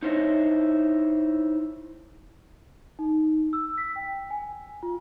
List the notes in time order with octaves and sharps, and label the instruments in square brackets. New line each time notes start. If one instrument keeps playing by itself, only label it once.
[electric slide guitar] D#4 E4 C5 C#5 D#5 E5
[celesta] D#4
E6
B6
G5
G#5
F4